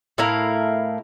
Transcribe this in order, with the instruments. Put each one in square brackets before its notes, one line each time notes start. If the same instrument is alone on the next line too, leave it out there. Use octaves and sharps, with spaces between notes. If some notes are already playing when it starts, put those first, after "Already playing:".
[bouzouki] A2 E4 A#4 F5